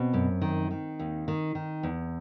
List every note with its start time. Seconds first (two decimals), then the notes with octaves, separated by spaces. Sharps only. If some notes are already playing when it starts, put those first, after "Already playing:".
Already playing: B2 C4
0.13 F#2
0.42 D#3
0.71 D#3
0.99 D#2
1.28 D#3
1.55 D#3
1.83 E2